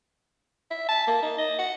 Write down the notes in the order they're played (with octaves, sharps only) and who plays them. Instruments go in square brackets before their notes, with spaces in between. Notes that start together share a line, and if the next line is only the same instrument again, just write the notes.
[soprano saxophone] E5
A5
A#3
D#4
D#5
F#5